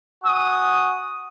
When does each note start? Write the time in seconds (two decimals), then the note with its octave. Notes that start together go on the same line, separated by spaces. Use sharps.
0.24 F#4 G#5 D#6